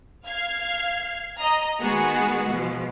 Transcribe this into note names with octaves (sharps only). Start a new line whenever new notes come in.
F5 F6 G#6 C7
D#5 A#5 D#6
D#3 G#3 B3 F#4 G#4
B2 F3